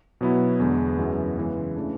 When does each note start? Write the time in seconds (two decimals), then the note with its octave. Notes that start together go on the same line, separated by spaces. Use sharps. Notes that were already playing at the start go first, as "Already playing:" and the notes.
0.21 B2 F#3 B3 E4
0.60 E2 D3 G#3 B3
0.99 F#2 E3 G#3 B3 E4
1.37 C#3 E3 G#3
1.76 C#3 E3 A3 D4